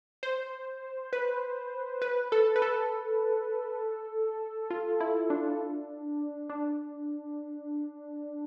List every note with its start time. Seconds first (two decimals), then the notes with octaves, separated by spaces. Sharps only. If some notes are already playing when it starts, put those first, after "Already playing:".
0.23 C5
1.13 B4
2.02 B4
2.32 A4
2.56 B4
2.62 A4
4.70 F4
5.00 E4
5.30 D4
6.50 D4